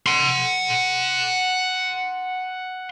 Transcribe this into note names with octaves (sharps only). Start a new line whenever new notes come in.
F#5 C6